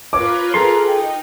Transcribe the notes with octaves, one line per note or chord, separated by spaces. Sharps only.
F4 A#4 B4 C#5 D6
G#4 A4 A#5 C6
D#4 G5